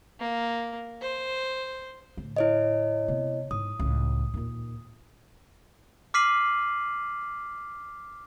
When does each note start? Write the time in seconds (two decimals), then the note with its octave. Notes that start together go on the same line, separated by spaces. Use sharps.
0.20 A#3
1.01 C5
2.17 A2 D3
2.36 E4 C#5 D#5
3.08 C3 B3
3.51 G#2 D#6
3.79 C#2 A2
4.34 D#2 A#2
6.14 D6 F6 B6 C7 D#7 F#7